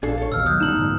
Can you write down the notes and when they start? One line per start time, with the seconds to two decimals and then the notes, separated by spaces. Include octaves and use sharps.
0.03 A#1 D4 G#4 A4 F5
0.18 A4 C#5
0.32 A#1 D#2 B2 E6 F6
0.46 D#3 F#3 D#6 F#6 G6
0.60 C2 G3 A3 D#4 E7 F#7
0.77 G#2 D3 F3